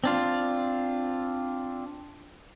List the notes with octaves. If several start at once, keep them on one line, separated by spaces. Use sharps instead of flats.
C4 D4 F4